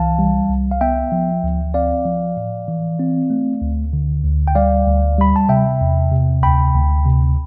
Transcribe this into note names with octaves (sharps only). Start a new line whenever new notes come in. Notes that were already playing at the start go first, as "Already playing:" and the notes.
Already playing: C2 E3 F5 A5
G3
C2
F5
B3 E5 G5
F3
D2
C4 D5 F5
F3
A2
E3
C4
A3
D2
D3
D2
G5
G3 D5 F5
D2
G3 B5
A5
C3 E5 G5
E2
C3
D2 G5 B5
D2
C3